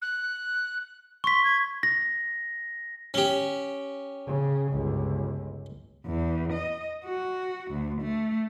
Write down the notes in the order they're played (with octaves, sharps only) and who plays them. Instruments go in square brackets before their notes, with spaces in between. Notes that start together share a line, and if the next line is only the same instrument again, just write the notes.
[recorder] F#6
[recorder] C6 [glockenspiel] C#6 B6
[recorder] G#6
[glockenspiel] A#6
[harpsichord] C#4 G4
[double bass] C#3
G1 C#2
[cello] E2
D#5
F#4
D2
A3